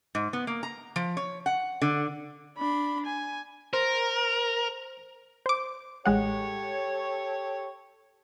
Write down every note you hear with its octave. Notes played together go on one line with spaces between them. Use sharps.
G#2
B3
A#3
A#5
F3
C#5
F#5
D3
D4 B5
G#5
A#4 C5
C5 D6
A1 G#3 G4 A4 C#5 F#5